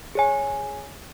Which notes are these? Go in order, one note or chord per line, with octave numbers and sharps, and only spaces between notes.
G#4 C#5 G#5